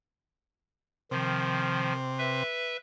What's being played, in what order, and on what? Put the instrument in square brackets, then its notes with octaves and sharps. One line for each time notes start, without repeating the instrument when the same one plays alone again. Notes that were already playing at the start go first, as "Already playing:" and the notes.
[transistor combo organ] C3 [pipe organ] D#3 F3
[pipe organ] B4 E5